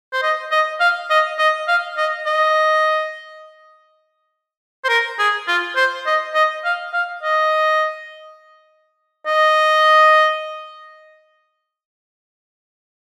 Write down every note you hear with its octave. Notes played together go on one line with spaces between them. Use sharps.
C5
D#5
D#5
F5
D#5
D#5
F5
D#5
D#5
C5
A#4
G#4
F4
C5
D#5
D#5
F5
F5
D#5
D#5